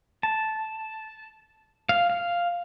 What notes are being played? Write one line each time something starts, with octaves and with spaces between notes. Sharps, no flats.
A5
F5
F5